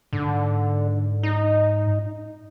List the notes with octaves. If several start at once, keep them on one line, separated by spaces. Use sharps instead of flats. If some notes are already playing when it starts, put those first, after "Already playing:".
G#2 D3
D#4